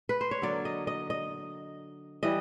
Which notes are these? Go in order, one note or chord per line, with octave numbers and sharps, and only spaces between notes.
B4
C5
C#5
D3 F#3 A#3 D5
D#5
D#5
D#5
E3 G3 D#5